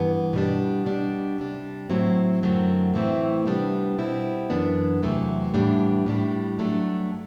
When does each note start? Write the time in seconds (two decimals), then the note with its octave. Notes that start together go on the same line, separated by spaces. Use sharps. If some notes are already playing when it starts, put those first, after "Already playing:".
Already playing: G2 E3 B3
0.33 B2 G3 D4
0.86 B2 G3 D4
1.38 C3 G3 D4
1.90 A2 F#3 C4 E4
2.43 F#2 D3 F#3 A3 C4
2.94 A2 E3 A3 C4 E4
3.46 C3 G3 B3 D4
3.98 B2 G3 C4 E4
4.50 F#2 E3 B3 D4
5.02 E2 C3 F#3 A3 E4
5.54 A2 E3 G3 B3 D4
6.06 A2 G3 D4
6.59 G2 F#3 A3 D4